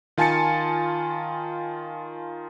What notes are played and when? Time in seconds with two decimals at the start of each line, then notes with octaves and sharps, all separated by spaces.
0.18 D#3 F4 G#5 A5 A6 C#7